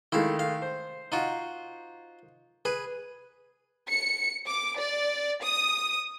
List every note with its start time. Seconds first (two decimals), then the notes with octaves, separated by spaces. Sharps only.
0.12 D#3 G#3 A3 E4 F5
0.39 F5
0.62 C5
1.12 D#4 F4 F#4
2.65 G#4 B4
3.90 C#7
4.47 D6
4.79 D5
5.43 D#6